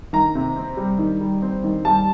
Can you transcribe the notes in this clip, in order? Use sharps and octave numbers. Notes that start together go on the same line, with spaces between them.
D#3 A#5
C3
C4
G3
D#3
G3
C4
D#3
G3 A5